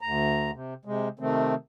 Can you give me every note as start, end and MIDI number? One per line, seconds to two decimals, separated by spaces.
0.01 0.51 38
0.01 0.51 82
0.54 0.74 48
0.85 1.08 48
0.85 1.08 56
1.19 1.54 48
1.19 1.54 51
1.19 1.54 57
1.19 1.54 60